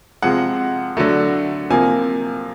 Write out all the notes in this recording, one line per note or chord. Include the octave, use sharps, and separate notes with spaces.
C3 F3 G#3 F#5
D3 F#3 A3
C3 F3 A#3 G#5